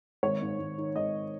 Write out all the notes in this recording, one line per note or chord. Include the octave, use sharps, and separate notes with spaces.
G#1 C#5
G#2
G#1
D#3
G#1 D#5